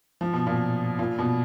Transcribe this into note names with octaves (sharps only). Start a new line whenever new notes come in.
F3
B2
A#2
A#2
B2